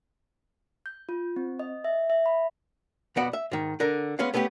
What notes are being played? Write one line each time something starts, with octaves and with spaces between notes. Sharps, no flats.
G6
F4
C4
D#5
E5
E5
B5
B1 F2 B3 F#4 D5 F#5
E5
G#2 D#3
D3 A#4
G#3 B3 C#4 F5
A3 B3 C#4 F#4 G4